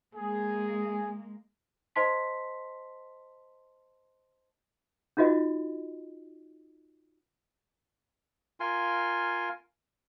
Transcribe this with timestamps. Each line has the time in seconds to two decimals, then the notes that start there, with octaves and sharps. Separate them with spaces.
0.15 G#3 A#3 G#4
1.96 C5 D#5 A5 C6 B6
5.17 C#4 D#4 F4 F#4 D#5
8.60 F4 A#4 G#5 C6